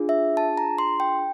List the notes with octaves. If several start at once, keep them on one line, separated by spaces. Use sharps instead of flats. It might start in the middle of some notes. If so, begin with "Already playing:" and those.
Already playing: D4 F4 G#4
E5
A5
A#5
C6
G5